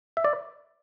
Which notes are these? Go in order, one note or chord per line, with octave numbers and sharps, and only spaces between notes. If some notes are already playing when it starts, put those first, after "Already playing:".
E5
D5